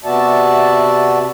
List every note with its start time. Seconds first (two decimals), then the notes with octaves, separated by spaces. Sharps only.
0.05 C3 B3 F#4 D5 E5 A5